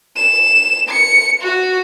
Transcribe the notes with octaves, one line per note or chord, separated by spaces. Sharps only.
E7
C#7
F#4